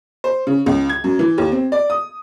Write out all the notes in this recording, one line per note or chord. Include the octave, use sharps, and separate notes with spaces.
C5
C#3
C#2
G#6
F#2
E3
D#2
C4
D5
D#6